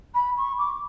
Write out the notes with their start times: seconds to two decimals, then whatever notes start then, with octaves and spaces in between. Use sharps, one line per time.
0.14 B5
0.37 C#6
0.58 D6